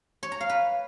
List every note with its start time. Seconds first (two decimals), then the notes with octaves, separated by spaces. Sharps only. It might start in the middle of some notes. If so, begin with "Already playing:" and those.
0.23 C#5
0.32 A#5
0.41 F5
0.49 B4